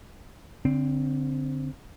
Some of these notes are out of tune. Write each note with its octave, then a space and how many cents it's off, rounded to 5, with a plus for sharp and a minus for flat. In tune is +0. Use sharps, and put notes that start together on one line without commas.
D3 -25 C4 +0